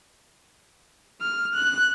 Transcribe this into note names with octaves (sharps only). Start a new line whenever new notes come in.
F6
F#6